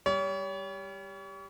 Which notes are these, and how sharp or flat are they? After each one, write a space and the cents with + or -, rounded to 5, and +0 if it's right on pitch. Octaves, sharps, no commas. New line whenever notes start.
G3 +10 C#5 +40